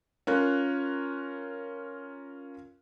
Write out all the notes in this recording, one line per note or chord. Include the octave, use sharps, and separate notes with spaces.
C#4 F4 A#4 F#6